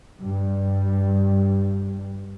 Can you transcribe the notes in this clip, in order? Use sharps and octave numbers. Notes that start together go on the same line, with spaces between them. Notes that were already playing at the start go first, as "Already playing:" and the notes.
G2 G3